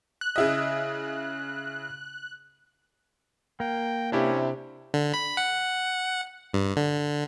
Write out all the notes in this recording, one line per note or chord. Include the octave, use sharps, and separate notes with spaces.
F#6
C#3 E4 D#5
A#3 G5
C3 C#4 D4 E4 G4
D3
B5
F#5
G2
D3